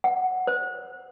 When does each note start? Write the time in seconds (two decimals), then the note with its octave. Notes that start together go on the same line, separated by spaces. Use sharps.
0.04 F#5
0.47 C5